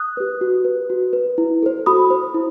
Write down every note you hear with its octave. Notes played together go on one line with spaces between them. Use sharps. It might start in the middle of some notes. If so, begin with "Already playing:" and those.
Already playing: D#6 F#6
G4 B4
F#4
B4
F#4
B4
E4
A4 C5
F#4 B5 D#6
C5
E4